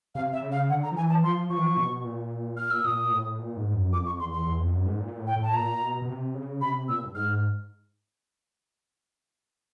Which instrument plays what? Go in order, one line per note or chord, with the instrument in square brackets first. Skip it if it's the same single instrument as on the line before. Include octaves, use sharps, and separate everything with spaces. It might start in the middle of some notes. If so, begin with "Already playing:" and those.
[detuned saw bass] C3 [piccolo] F5
[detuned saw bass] C3 [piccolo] E5
[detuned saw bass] C#3
[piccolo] F5
[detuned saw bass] D3 [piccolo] F#5
[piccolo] A#5
[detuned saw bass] F3
[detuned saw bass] E3 [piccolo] G#5
[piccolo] A5
[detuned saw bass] F3 [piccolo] C6
[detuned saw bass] F3 [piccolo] C#6
[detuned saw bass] E3
F3
B2
A#2
[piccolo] F6
E6
[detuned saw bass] A#2 [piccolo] D#6
[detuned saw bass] A2
A#2
G#2
F#2
[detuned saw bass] F2 [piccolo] D6
[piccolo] C#6
[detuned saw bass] E2 [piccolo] C6
[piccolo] C6
[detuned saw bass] E2
F2
F#2
G#2
A#2
A2
[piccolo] G5
[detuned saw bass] A2
[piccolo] A5
[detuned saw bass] A#2 [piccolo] A#5
[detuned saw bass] B2
B2
C3
C#3
[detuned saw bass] C3 [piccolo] B5
[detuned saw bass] A#2 [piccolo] E6
[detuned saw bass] G2
[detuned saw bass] G#2 [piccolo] F6